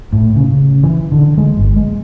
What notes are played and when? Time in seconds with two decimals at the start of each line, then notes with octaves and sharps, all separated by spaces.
0.13 A2
0.36 C#3
0.83 E3
1.12 D3
1.38 G#3
1.57 G1
1.76 G#3